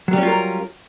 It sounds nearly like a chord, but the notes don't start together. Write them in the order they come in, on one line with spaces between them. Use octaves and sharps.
F#3 G3 C#4 F4 A#4